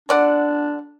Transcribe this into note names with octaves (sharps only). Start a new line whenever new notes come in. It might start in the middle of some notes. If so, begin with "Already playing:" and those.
D3 D4 D5 F#5